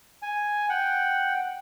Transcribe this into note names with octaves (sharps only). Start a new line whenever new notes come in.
G#5
F#5 G5